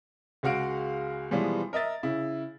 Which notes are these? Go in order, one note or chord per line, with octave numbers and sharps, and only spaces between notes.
C#2 G#3 F#4 F5 F#5 D7
B2 E3 F3 G3 G#3 B3
A#4 D#5 E5 A6
C#3 E4